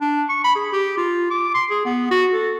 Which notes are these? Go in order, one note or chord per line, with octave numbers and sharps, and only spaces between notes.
D4
C#6
B5
G#4
G4
F4
D6
C6
G#4
B3
F#4
A4